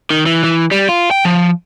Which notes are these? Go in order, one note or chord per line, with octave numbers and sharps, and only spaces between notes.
D#3
E3
E3
G3
F4
G5
F3